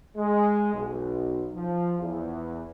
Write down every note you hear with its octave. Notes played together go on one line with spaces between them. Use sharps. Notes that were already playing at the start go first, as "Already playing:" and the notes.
G#3
B1
F3
E2